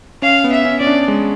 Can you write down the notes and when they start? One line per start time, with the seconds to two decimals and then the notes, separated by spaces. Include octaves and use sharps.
0.22 C#4 F5
0.44 B3
0.52 E5
0.65 C#4
0.80 C#4 D5
0.87 D4
1.08 G#3